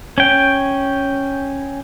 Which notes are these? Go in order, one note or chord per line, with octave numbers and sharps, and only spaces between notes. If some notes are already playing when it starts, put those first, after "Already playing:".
C#4 G5